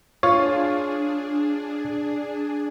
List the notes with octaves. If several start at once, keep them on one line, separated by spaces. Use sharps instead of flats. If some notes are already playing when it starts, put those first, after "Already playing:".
D4 F4 G#4 C#5